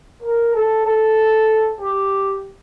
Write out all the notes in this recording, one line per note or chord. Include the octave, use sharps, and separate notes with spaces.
A#4
A4
A4
G4